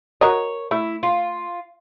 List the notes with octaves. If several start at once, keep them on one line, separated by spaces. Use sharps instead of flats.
F#4 A#4 C#5 D#5
A3 E4
F4